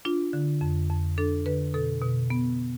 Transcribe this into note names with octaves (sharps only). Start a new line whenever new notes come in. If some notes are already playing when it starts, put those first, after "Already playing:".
D4 F4
D3
F2
F2
D4 A4
D3 B4
B2 A4
B2
B3